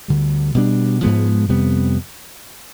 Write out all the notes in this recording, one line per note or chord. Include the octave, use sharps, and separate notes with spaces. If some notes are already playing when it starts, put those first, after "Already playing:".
D2 D3 G3
B2 G3 D4
G#2 F3 G#3 B3
F2 C3 G3 B3